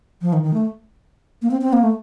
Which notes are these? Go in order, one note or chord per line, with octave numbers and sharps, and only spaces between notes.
F3
D#3
D#3
A3
A#3
C4
C4
A#3
A3